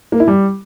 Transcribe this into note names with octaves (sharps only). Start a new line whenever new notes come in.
A#3
E4
G3